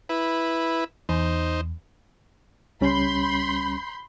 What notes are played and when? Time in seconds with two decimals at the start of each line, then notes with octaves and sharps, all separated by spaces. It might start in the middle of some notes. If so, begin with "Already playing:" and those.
0.09 E4 B4
1.09 E2 D#4 C5
2.81 C#2 G3 C#4 B5 C6 G6